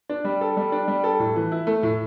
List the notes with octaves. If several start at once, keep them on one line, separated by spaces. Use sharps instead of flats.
D4
G3
A4
G3
D4
G3
A4
A2
E3
E4
A3
A2